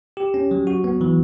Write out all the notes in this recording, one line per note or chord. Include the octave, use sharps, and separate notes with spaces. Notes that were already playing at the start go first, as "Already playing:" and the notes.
G4
C#4
F#3
F#4
B3
E3